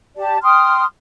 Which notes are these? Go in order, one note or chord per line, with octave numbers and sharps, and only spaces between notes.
G4 D5 A5
G5 C6 D#6 F6